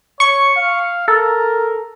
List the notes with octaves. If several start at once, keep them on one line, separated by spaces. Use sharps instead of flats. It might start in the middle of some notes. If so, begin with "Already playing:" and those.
C#5 C#6 C#7
F5
A4 A#4